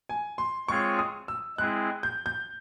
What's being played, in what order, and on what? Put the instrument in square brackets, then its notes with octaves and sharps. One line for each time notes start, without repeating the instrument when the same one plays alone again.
[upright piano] G#5
C6
[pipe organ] G#3 C4 F4 G#4 C#5 [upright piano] C#6
[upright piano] D#6
E6
[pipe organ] G#3 C4 E4 G#4 [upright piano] F#6
[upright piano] G6
G6